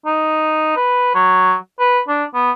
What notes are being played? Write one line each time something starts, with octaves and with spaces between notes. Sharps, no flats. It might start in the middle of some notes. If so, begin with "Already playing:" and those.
D#4
B4
F#3
B4
D4
B3